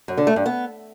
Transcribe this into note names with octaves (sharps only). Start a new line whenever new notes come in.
F#2
D3
A3
G2
B3